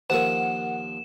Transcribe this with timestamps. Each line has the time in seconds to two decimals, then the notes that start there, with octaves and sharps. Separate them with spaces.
0.10 D#2 F3 A#4 C5 F#5 C#6 E7